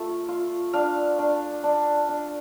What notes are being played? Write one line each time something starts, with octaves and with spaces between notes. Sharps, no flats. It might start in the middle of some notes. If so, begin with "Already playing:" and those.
Already playing: A3 F4
F4
D4 F5
D4
D4
D4